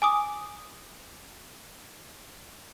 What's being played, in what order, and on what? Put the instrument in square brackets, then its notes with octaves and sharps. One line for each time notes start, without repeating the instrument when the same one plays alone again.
[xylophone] G#5 D6 D#6